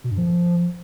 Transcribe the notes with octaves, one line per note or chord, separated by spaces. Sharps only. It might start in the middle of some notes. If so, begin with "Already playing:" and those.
B2
G2
F3